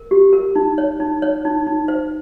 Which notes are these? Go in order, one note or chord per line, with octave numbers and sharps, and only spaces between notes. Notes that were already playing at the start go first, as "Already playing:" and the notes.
Already playing: A#4
G4
A#4
D#4
C#5
D#4
C#5
D#4
D#4
C5